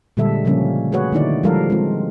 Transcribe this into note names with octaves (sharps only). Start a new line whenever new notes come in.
A#2 D3 G3 G#3 A4 E5
C#3 F3 G3 A#3 C#4
A3 F#4 G#4 B4 C#5 F#5
D3 D#3 A#3 D#4 E4 D5
F3 G3 G#3 A4 A#4 F5
G#3 C4 F4